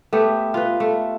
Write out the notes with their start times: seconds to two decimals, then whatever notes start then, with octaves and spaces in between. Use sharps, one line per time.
0.13 A3 B3 G4
0.54 F4 B4
0.80 A3